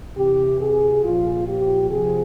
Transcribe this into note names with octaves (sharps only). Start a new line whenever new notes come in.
C3 E3 G4
G#4
A#2 F3 F4
G4
C3 F3 G#4